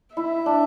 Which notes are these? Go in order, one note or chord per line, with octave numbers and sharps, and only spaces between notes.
E4 E5
D4